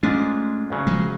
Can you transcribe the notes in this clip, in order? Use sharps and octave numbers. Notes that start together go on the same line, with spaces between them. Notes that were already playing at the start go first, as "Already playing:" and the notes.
G#2 G#3 A3 C#4 D4 F4
D2 C#3 F#3
F3 G#3